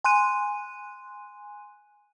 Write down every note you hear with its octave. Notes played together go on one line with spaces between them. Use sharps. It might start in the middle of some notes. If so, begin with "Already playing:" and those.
G#5 C6 F#6 D#7